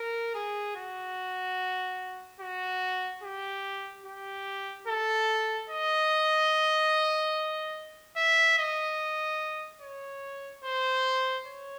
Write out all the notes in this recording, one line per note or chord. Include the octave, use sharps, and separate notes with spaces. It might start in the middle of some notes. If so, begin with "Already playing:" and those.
Already playing: A#4
G#4
F#4
F#4
G4
G4
A4
D#5
E5
D#5
C#5
C5
C#5